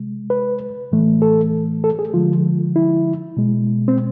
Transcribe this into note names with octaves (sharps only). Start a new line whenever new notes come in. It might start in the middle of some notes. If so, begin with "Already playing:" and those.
Already playing: C3 G#3
B4
A2 E3 A3
A4
A4
G#4
D3 F3 G#3 F4
E4
B2 G#3
C4